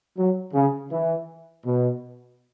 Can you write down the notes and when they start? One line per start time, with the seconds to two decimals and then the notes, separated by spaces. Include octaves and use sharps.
0.16 F#3
0.54 C#3
0.90 E3
1.65 B2